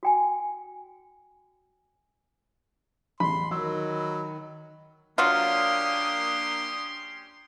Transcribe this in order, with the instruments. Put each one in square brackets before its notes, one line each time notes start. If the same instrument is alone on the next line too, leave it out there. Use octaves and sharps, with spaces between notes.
[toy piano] F#4 G5 G#5
[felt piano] A1 E2 [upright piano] B5 [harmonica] C6
[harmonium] D#3 [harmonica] F#3 [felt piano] E6
[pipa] F#3 F4 [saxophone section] A#3 D4 [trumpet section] C#4 G4 C6 [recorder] D#6